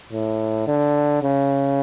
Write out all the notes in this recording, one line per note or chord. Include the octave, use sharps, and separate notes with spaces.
A2
D3
C#3